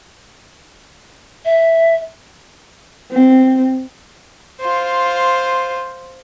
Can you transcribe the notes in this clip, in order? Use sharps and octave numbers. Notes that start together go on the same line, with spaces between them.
E5
C4
F4 C5